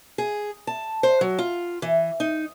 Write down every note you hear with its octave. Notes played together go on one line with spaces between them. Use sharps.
G#4
A5
C5
F#3
F4
E3
D#4